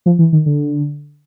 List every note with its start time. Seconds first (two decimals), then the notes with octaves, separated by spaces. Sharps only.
0.06 F3
0.19 E3
0.33 D#3
0.46 D3